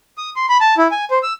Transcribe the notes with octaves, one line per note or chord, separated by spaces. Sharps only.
D#6
C6
B5
A5
E4
G#5
C5
E6